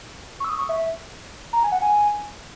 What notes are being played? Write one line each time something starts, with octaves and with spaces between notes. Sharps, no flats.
C#6
E6
D#6
C#6
E5
A#5
G#5
F#5
G#5